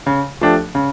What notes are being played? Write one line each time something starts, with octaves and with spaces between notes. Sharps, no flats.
C#3
F3 A3 D4 G4
C#3